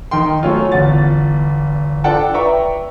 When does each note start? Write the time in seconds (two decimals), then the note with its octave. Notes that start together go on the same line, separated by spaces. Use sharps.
0.11 D#3 D#4 A#4 G5 C6
0.43 F#3 A3 C#4 F4
0.72 G1 E2 F4 F#5 A6
2.04 D4 F4 A4 F#5 G5 A5
2.33 B4 D5 E5 G5 A#5 C#6